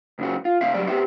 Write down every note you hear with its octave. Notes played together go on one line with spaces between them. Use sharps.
C#2 F#2 C#3 F#4
F4
C3 C4 E5 F5
C#2 F#3 G3 D5
B3 C4 G4 E5